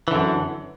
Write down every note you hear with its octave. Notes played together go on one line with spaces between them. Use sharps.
F#2 D3 E3